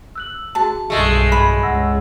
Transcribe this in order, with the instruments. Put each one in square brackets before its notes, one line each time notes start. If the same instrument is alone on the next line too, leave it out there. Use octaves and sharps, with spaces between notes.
[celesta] E6 F#6 F#7
[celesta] F#4 G#4 [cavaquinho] A5
[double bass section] B1 G2 [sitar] G#3 A3 [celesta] G#4
[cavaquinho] B5
[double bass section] C#2 [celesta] F#5 E6 A#6